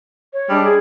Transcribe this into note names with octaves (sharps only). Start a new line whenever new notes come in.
C#5
G3 G#3 D4
G#4